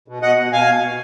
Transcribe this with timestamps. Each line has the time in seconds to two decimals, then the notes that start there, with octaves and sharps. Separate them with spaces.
0.08 B2
0.22 B2 D#5 F#5
0.37 B2
0.52 B2 F5 G#5
0.67 B2
0.82 B2